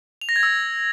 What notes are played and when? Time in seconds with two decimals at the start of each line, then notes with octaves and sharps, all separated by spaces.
0.21 F7
0.29 A#6
0.36 G#6
0.43 E6